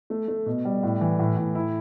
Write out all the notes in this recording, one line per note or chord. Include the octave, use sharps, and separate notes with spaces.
A3
A3
B2
G3
A2
E3
A2
A2
E4